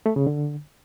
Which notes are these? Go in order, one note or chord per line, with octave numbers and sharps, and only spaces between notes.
A3
C#3
D3